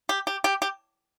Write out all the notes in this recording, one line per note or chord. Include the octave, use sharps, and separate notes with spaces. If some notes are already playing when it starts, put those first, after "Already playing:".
G4
G4
G4
G4